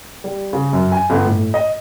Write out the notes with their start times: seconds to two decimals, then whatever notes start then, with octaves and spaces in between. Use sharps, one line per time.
0.24 G3
0.53 C#3
0.73 F#2
0.92 G#5
1.10 G1
1.25 A2
1.54 D#5